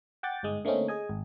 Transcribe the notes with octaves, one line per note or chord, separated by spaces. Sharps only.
F#5 G5 D6 A6
G1 G#2 G#3 D#6
D3 A3 A#3 C4 C#4 D#4
G#4 D#5 G#5
G#1